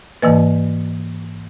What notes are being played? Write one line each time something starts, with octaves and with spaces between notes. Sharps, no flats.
G#2 E3 A#3 B4 D#5